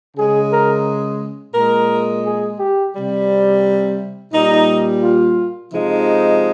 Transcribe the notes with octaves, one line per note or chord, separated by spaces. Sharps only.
C#3 G#3 G#4
A#4
A#2 G#3 A#4
G#4
G4
C3 G3
A#2 G3 D#4
F4
C3 F3 G#3 D#4